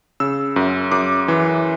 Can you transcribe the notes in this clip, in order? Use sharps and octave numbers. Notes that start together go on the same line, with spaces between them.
C#3 E6
F#2
F#2 D6
E3